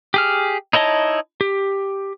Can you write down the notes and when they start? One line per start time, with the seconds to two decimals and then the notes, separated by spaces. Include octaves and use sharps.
0.14 G4 G#4 F6
0.73 D#4 E4 C#5 D#5 A5
1.41 G4